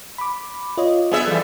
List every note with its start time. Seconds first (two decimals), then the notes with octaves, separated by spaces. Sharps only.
0.18 B5 D6
0.77 F4 C#5 D#5
1.12 B3 G#4 E5
1.27 E3 G3 A4